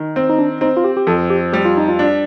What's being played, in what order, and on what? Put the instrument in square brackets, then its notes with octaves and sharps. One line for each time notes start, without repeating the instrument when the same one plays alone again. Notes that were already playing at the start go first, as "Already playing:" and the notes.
Already playing: [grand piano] D#3
C4
[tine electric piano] D#4
D4
[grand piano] C4 [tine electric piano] D#4
[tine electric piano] F4
G4
G4
[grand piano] F2 [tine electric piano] A4
[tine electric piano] G4
[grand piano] G3 [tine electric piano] G4
[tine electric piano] F4
D#4
F4
[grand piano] D4